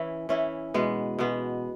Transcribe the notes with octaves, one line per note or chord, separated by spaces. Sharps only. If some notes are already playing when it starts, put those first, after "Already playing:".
Already playing: E3 C#4 E4
E3 C#4 E4
B2 G#3 B3
B2 G#3 B3